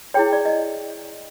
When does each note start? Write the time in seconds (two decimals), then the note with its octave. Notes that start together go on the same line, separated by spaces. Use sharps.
0.14 E4 G#4 C#5 G5
0.33 D5
0.45 D#5